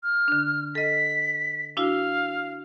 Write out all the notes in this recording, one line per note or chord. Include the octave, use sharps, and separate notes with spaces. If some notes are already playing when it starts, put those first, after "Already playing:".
F6
D3 D4
A4 D#5 B6
D4 E4 F#4 F5